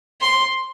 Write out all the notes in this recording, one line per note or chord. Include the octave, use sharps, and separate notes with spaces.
C6